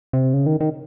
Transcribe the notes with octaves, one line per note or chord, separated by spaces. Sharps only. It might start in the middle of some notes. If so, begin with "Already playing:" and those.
C3
C#3
D#3
D#3